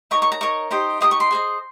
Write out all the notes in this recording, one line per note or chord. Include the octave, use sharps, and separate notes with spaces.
D#4 A#4 C#5 C#6
C#6
A#5
D#4 A#4 C#5 C#6
D#4 G4 C5 D#5
D#4 G4 C5 D#5 D#6
C#6
C6
G#4 C5 D#5